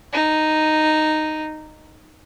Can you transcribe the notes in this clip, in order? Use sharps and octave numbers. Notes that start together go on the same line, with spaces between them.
D#4